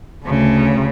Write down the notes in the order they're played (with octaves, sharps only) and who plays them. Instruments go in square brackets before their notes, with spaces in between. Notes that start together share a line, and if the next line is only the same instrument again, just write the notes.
[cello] D2 C#3